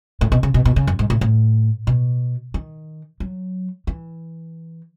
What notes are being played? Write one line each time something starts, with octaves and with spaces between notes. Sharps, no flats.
A2
B2
C#3
B2
B2
C#3
F#2
G#2
A2
A2
B2
D#3
F#3
E3